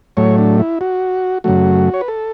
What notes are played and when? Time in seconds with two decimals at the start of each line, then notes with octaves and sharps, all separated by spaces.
0.17 A2 F#3 A3 C#5
0.38 D4
0.59 E4
0.81 F#4
1.44 F#2 C#3 F#3 A3 F#4
1.94 C#5
2.01 B4
2.08 A4